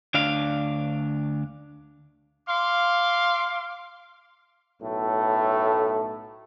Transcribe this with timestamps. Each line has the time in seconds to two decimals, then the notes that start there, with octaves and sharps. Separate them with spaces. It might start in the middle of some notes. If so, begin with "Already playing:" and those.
0.14 D2 D4 F5
2.47 F5 C6 D6
4.82 B1 A2 A3 A4